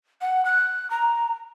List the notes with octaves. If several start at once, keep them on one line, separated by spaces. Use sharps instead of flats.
F#5
F#6
A#5